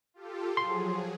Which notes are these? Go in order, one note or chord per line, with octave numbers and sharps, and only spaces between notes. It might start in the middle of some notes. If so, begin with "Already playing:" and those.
F4 G4 A4
F3 F#3 G#4 C6